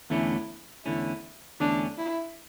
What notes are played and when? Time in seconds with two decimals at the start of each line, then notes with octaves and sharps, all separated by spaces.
0.10 E2 D3 A3 C#4 E4
0.85 E2 D3 A3 C#4 E4
1.60 E2 D3 A3 C#4 D4
1.98 E4